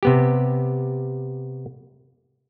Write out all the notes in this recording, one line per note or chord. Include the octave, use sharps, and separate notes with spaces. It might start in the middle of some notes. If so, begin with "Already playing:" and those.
C3 B3 G4